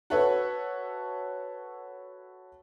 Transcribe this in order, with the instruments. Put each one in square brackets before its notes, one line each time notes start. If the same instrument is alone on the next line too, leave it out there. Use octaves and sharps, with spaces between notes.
[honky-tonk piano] F#4 A4 B4 C#5 E5